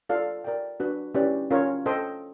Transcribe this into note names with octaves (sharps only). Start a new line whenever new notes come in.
F4 A4 D5 F5
A#4 D5 G5
D4 F#4 B4
C#4 E4 G4 B4 D5
C#4 F4 A#4 C#5
A4 C5 D#5 G5